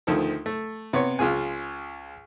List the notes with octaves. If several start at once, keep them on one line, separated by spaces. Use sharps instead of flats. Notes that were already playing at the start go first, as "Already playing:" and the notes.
D2 D#3 F3 A4
A3
C3 B3 C#5
C#2 F4 G#4 G#5